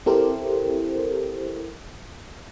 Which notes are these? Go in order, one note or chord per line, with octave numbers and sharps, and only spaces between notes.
C4 E4 G4 A4 A#4 C5